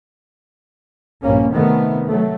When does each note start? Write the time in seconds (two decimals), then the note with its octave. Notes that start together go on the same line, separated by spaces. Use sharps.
1.21 A#1 G2 A#3 C#4
1.52 C3 D#3 A3 B3
2.06 F#3 A3